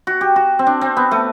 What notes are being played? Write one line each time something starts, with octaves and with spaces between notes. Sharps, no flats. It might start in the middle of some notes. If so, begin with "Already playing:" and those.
F#4
G4
F#4
C4
D4
C4
B3
A3